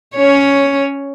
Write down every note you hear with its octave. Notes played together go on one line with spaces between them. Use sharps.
C#4 C#5